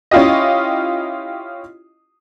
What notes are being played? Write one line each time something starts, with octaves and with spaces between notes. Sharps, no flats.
C#4 E4 F4 G4 D#5